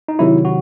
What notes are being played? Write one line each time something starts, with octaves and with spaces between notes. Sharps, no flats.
D#4
C3 D#3 F#3 E4
F#4